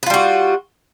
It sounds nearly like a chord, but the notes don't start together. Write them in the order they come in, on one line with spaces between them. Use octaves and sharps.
B4 F4 G3 F#4